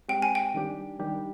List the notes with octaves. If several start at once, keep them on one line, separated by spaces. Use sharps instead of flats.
G#3 C4 G4 G5
G#5
G5
D#3 G3 D4 G4
D#3 G3 D4 G4